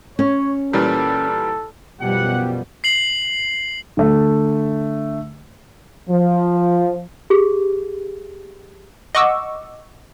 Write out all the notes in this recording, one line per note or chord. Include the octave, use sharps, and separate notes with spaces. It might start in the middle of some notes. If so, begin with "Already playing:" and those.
C#4 C#5
A#2 E3 G3 A4
F#2 B2 F3 G3 B3 G4 F#5
C7 F#7
D3 A3
F3
G4 G#4
D#5 F#5 C#6 D6 E6